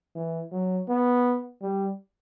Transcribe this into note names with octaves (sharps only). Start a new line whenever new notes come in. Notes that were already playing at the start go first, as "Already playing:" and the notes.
E3
F#3
B3
G3